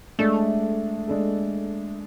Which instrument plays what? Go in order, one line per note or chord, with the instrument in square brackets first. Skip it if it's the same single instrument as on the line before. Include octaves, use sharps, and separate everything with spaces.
[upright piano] G#3 D4 A4 [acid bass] A3
[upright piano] G#3 D4 A4